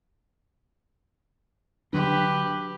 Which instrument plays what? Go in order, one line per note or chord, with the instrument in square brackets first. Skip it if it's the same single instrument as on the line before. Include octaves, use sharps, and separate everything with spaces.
[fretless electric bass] D3 F#3 D4 [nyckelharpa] G4 B4